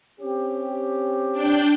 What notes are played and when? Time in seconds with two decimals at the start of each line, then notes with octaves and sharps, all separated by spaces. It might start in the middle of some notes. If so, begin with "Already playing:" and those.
0.20 C4 C#4 G4
1.32 D4 G5